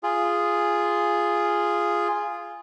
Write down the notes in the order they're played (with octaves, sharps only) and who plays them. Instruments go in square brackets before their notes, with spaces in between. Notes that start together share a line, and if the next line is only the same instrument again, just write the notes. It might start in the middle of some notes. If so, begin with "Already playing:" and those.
[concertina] F4 G#4